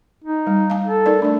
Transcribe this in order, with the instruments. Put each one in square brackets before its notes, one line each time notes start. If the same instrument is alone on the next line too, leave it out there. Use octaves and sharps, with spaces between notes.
[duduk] D#4
[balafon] G3
F5 A5
[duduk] A4
[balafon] D#4 A#4 D5
[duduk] A3 [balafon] D4 D5